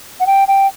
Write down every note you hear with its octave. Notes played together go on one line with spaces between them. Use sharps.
F#5
G5
G5